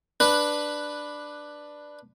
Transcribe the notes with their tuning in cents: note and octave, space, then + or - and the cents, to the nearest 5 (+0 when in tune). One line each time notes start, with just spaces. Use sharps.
D4 +5 B4 +0